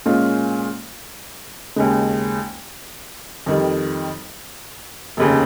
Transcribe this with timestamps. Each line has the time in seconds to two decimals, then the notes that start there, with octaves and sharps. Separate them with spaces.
0.06 A#2 G#3 C#4 F4
1.76 D#2 C#3 G#3
3.46 F2 D#3 G3
5.17 F1 D#2 C#3